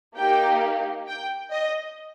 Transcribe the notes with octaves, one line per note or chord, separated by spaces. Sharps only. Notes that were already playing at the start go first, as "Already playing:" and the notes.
A#3 D#4 G4 G5
G5
D#5